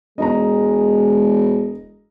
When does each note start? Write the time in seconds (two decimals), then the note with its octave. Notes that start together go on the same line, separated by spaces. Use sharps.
0.18 E1 G#3 D#5 A#5